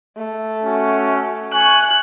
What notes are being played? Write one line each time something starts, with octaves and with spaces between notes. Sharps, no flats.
A3
C#4 F#4
G#5 C#6 F#6